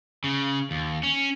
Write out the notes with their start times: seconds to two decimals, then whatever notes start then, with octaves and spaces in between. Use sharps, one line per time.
0.24 C#3
0.71 D#2
1.03 C#4